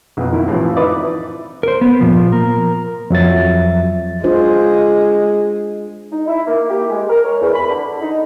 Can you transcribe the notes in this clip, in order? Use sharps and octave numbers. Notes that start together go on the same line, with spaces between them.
B1 F2
D#3 E4
A2 C3 E3 F3
D#4 E4 B4 D5
A#4 C5
B3
A#2 F3
A#4
F2 F#3 E5 A6
G#3 D4 F4 C5
D#4
E4
A#3
G4
G#3
A#4
C#5
E2
B5
D3
D#4